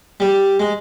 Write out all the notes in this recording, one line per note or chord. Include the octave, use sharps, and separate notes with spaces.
G3
G#3